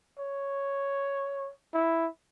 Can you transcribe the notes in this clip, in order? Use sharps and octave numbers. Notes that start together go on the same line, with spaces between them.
C#5
E4